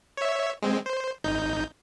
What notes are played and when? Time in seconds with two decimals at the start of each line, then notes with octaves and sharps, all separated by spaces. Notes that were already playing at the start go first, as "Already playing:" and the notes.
0.17 C#5 E5
0.62 G#3 C4
0.86 C5
1.24 G#1 D#4 G6